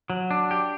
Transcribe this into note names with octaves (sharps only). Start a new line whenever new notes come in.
F#3
D4
G4